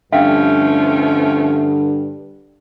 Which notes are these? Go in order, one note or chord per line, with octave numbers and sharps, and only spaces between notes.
G2 D3 F3 A3 C#4 E5 F5 G5